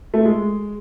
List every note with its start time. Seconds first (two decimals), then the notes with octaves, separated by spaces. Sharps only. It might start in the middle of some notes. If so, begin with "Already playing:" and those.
0.14 A3
0.25 G#3